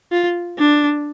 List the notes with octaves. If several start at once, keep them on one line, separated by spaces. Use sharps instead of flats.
F4
D4